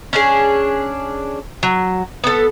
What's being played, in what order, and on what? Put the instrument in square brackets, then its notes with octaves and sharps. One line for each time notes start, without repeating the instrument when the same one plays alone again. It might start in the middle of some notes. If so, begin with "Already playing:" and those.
[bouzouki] C#4 D4 G#4
F#3
B3 A4